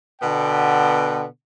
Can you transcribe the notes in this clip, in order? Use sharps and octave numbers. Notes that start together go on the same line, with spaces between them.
B2 D3 B3 G5